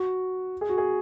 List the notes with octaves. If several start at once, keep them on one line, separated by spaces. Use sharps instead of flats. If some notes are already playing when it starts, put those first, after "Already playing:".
Already playing: F#4
G#4
F#4
G#4